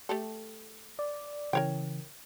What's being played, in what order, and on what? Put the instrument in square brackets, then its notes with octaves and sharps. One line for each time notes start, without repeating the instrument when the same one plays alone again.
[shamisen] A3 G4 A4
[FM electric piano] D5
[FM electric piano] C#3 E3 [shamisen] A#4 C#5 G5